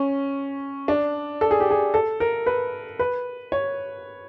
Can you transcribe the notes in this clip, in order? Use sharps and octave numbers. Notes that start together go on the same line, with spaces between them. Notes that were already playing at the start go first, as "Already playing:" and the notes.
Already playing: C#4
D4
A4
G#4
G4
G#4
A4
A#4
B4
B4
C#5